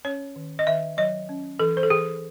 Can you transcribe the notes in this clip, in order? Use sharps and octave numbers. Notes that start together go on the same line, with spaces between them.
C#4 C#5
D#3
D#5
D#3 E5
F#3 D#5
C#4
E3 A4
C5
A4
E3 G#4